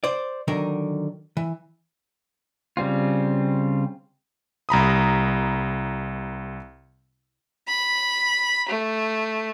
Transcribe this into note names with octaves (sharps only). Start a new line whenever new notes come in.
C5 D5
D3 D#3 F#3 D#4 A#4
E3
C#3 G3 C4 F4
C2 A#5 B5 D#6
B5
A3